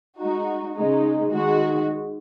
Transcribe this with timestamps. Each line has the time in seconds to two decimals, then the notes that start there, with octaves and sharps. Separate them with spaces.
0.17 G#3 D#4 F#4
0.75 C#3 G#3 D#4
1.33 D#3 G#3 F#4